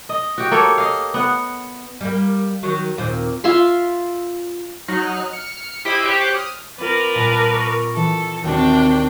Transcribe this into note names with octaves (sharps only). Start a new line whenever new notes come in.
D#5
F#4 G4
A#3 A4 C#5
D#5 F5
B3 F#5
G3 A#3
D#3 F#3
D#2 A#2 C4
F4 E5 F5 C6
F#3 D#4 F6 F#6
F6 C#7
E4 G4 C5 D#5 B5 D6
G4 C5 C#5 F#6 D7
D#6 F6
C4 F4 A#4 B4 D5
C2 A#2 A5
C#6
E3 A4
D#2 C3 D4 F#4 G5 C#6